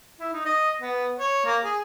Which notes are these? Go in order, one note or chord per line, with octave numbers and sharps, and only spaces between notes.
E4
D#4
D#5
B3
C#5
A#3
G#4